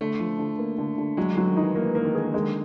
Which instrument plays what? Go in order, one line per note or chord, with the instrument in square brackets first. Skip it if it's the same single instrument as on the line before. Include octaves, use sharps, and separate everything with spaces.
[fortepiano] D3 [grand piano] A3
[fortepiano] F3
D3
A#3
D3
D3
[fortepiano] F#3 [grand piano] G#3
[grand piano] D3
[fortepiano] F#3
[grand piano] D#3
[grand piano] E3 [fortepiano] D#4
[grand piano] E3 [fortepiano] A#3
[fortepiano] A#3
[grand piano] D#3
[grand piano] D3 [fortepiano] G#4
[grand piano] D#3 [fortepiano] G#3
[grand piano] D3